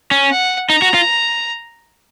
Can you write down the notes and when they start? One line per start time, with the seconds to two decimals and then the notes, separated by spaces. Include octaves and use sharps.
0.11 C#4
0.31 F#5
0.69 D#4 A#5
0.82 F#4
0.94 F4